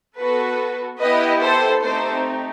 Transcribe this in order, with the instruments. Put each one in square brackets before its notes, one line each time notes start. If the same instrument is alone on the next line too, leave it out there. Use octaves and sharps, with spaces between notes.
[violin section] B3 F#4 A4 B4
B3 E4 G4 B4 D#5
A4 C5
A3 C4 D#4 G4 A4 C5